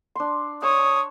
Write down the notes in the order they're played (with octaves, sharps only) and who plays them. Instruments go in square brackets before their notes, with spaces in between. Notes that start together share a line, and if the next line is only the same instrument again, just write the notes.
[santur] D4 C6
[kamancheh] C#5 [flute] D#6 [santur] E6